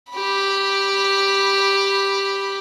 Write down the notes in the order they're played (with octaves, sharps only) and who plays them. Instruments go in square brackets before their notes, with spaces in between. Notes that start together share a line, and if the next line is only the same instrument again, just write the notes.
[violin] G4 B5